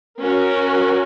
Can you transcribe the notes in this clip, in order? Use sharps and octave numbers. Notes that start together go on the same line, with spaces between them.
C#4 F#4 A#4